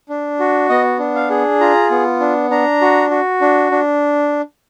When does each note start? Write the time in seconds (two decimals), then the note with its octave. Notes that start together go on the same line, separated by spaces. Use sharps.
0.09 D4
0.40 F#4
0.69 B3 D#5
0.99 D4
1.15 F5
1.30 G#4
1.60 F4 A#5
1.91 B3
2.20 D4
2.51 D4 A#5
2.81 F#4
3.11 F#4
3.41 D4
3.72 D4